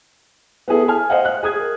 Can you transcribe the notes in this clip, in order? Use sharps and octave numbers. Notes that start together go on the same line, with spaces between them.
B3 E4 G#4 A4
G#5 F6
C5 D#5 F5 F#5
F#6
G#4 D#6 G#6
A#4